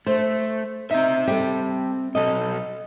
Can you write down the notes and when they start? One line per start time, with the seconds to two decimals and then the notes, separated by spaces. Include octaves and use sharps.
0.07 A3 C5
0.91 C4 D#4 E5
1.27 G3 A4
2.15 B1 A4 D#5